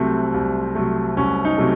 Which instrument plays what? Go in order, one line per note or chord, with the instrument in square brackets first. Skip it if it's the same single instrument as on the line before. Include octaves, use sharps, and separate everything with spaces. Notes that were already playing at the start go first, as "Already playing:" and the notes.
Already playing: [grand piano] C2 C3 F#3 A3 C4
C2
C3 F#3 A3
C2 C#4
D#4
C3 F#3 A3